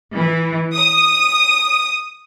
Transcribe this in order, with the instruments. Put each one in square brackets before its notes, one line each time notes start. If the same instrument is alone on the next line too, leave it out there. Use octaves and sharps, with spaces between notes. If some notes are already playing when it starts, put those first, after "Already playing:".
[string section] E3
D#6